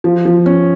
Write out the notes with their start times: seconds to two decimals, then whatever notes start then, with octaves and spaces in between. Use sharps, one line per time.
0.04 F3
0.25 F3
0.46 C#4